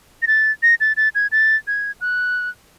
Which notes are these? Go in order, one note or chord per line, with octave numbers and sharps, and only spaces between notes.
A#6
A6
A#6
A6
A6
G#6
A6
G#6
F#6